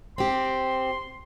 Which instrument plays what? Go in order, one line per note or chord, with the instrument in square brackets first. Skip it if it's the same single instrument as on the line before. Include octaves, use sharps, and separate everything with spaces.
[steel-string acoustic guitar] C4 G4 [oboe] C6